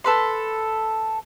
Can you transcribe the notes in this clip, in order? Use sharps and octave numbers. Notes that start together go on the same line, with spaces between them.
A4 B4 C6